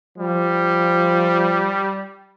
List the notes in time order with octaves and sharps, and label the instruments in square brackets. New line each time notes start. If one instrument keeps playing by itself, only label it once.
[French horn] F3 [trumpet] G3